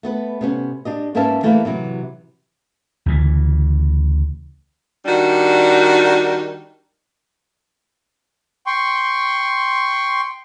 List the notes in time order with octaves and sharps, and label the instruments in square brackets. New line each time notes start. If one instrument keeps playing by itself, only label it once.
[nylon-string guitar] A3 B3 B4
C3 B3 C#4
D4 G4 D#5
G#2 A#3 C#4 B4 E5 A5
E3 A3 A#3 E4 G4 B4
C3 E3 F#3
[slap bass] D2 C#3 E3
[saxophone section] D#3 G3 D4 F#4
[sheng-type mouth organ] G5 C6 C#6